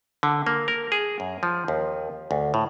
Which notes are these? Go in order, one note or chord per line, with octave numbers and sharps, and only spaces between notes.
D3
A#3
A#4
G#4
F#2
F3
D#2
D2
A2